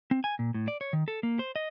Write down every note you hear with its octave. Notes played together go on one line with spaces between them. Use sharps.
C4
G#5
A#2
A2
D5
C#5
D#3
A4
A#3
C5
D#5